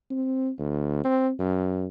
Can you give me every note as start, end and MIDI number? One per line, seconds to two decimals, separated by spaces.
0.10 0.51 60
0.59 1.04 38
1.04 1.31 60
1.39 1.86 42